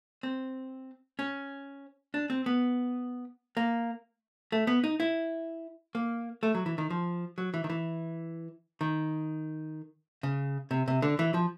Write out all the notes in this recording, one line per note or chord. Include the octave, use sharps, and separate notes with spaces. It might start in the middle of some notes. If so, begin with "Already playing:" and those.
C4
C#4
D4
C4
B3
A#3
A3
B3
D#4
E4
A#3
A3
F#3
E3
D#3
F3
F#3
E3
D#3
E3
D#3
C#3
C3
C3
D3
E3
F3